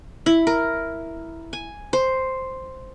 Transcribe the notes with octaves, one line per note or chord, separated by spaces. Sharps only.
E4
A#4
G#5
C5